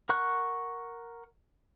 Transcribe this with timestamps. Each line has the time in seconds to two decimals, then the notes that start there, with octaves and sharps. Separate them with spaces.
0.09 A#4 F#5 C#6 F#6